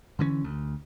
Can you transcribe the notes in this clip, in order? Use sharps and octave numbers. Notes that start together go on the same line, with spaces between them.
D3 E3 A#3 C#4
D2